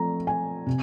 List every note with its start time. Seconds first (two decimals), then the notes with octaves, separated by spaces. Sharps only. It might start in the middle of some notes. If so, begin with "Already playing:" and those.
Already playing: F3 A3 C4 A#5
0.27 G#5
0.67 C3